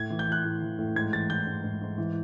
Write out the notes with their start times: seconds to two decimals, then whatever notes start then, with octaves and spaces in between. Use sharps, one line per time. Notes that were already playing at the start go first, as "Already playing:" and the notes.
Already playing: A2 G#6
0.10 E3
0.19 G6
0.27 E3 F#6
0.44 A2
0.62 E3
0.79 A2
0.96 G#2 G#6
1.13 E3 A6
1.30 E3 G6
1.47 G#2
1.64 G#2
1.82 G#2
1.98 E3